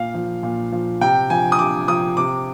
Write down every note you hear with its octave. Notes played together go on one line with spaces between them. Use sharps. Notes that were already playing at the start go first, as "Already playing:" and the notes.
Already playing: A#2 F5
F3
A#2
F3
C3 G5
F3 G#5
D#6
C3 D6
F3 D#6
C3 D6